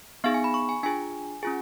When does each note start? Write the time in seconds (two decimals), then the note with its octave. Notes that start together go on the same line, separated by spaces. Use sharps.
0.24 B3 D#4 G#4 F5
0.34 G#5
0.44 B5
0.54 C#6
0.69 G#5
0.83 D4 F4 G#4 G#5
1.43 C#4 F4 G#4 G#5